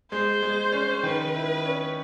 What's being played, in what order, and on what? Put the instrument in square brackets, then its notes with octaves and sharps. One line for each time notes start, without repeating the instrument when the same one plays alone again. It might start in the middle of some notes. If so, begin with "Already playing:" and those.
[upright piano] G#3 [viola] C5
[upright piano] G#3
C#4
[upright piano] D#3 [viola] B4
[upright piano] E4
C#4